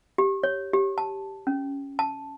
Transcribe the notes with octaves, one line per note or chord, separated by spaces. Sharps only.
G4
C#5
G4
A5
C#4
A5